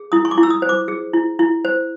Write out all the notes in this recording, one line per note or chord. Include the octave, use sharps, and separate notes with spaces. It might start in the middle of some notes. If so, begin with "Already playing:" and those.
Already playing: G#4
E4 D#6
C#6
D6
E4
E6
D#6
C5
D6
G#4
E4
E4
C5